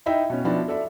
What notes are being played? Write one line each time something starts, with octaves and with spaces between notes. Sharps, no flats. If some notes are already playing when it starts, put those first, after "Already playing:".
D#4 E4 D#5 E5 G5
B2 C#4
F3 B3 D4 E4 F#4
A4 D5 E5